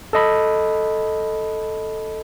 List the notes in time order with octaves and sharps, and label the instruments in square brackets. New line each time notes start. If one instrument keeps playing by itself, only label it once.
[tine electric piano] A4 D#5 B5